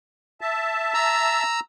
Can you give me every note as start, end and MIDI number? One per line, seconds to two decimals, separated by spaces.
0.41 1.43 76
0.41 1.43 81
0.94 1.60 82
0.94 1.60 88